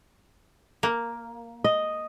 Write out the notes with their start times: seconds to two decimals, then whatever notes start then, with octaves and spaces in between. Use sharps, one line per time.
0.83 A#3
1.64 D#5